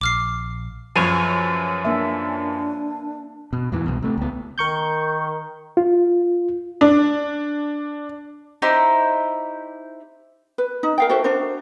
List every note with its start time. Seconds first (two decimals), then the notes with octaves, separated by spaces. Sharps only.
0.01 A#1 D6 F6 C7
0.96 F#2 F3 G#4 B4 C#5
1.85 A#3 D4 E5
3.53 B2
3.72 E2 G#2 E3
3.86 C2 B2
4.03 C3 A3
4.18 C#2 B3
4.58 D#3 A#4 C#6 G6
5.77 F4
6.81 D4
8.62 D#4 E4 G4 C5
10.58 B4
10.83 D#4
10.98 A#4 F5 G5
11.09 F#4 A4 C5 E5
11.24 D4 F#4 A#4 C5